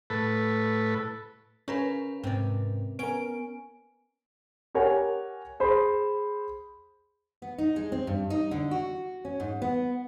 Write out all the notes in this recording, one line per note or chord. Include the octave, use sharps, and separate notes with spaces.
A2 A4 B4
C#3 C#4 A#4 B4
G#2 C3 C4 D5
B3 C#4 A#4 D7
G4 A#4 C#5 F#5 G#5
G#4 C5 B5
B3
D#4
G#3
C4
G2
D#4
D3
F#4
C#4
G#2
B3